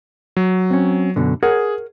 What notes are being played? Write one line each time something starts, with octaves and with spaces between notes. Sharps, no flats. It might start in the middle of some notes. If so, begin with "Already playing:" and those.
F#3
C4 C#4
F#2 B2 D3
G#4 A#4 C#5 F#5